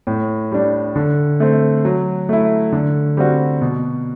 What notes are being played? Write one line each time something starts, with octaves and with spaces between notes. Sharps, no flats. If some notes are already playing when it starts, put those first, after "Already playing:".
A2
G3 D4
D3
A3 C4
F#3
A3 E4
D3
G3 C4 F#4
B2